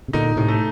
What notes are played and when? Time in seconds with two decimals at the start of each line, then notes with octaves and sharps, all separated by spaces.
0.08 C3
0.13 A#2 D3 D#4
0.36 A2 C3
0.48 A3